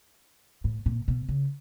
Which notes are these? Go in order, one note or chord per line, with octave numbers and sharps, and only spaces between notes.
A2
A#2
B2
C#3